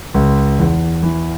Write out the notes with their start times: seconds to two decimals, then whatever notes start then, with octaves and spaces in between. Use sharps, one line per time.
0.14 C#2
0.59 E2
1.03 E3